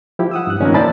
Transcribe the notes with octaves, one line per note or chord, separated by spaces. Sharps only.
F3 E4 G4
F#5 D#6 E6
G2 F#6
A#2 D#3 F3 A#3 C4 C#4
E4 C5 D5 A5 B5 A6